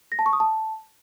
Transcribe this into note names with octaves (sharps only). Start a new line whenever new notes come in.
A#6
A5
C#6
D#6
A5